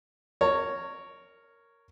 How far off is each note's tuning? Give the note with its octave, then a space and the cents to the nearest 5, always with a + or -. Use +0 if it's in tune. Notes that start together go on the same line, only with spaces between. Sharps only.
A#4 -10 C#5 +0 A#5 -45